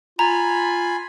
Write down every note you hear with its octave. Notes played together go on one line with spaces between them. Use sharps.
F4 G#5 A#5 B5